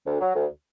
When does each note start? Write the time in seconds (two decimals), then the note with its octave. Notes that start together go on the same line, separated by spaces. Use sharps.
0.07 D2
0.21 F#3
0.36 D2